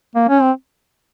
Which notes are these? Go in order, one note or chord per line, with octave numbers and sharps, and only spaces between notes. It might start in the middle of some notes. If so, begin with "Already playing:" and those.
A#3
C#4
C4